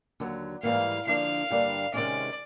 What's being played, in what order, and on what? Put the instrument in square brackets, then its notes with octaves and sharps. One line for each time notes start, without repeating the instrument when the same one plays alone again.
[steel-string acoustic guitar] D#2 D3 F#3
[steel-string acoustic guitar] G#2 E3 G3 A#3 [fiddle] F5
[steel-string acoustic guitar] D3 F3 A#3 D4 [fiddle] F5
[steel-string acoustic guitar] G2 D3 G3 A#3 D4
[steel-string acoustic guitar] C3 D#3 G#3 C#4 [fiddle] D5